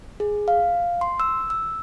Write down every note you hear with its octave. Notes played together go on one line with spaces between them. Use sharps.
G#4
F5
C6
E6
E6